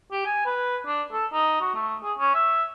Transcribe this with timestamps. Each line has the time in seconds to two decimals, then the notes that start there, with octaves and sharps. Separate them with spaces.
0.11 G4
0.26 G#5
0.46 B4
0.87 D4
1.12 A4
1.33 D#4
1.61 F#4
1.74 A3
2.03 G#4
2.18 C#4
2.34 E5